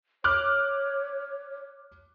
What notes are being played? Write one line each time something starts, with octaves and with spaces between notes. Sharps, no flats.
C#5 D6 F6 F#6